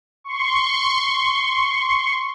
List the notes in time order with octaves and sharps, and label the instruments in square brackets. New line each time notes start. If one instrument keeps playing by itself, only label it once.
[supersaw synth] C6 C#6